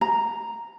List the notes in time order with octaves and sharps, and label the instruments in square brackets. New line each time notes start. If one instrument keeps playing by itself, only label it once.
[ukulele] A#5